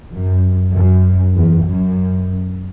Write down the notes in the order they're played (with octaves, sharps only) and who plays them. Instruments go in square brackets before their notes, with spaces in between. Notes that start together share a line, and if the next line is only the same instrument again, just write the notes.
[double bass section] F#2
F#2
E2
F#2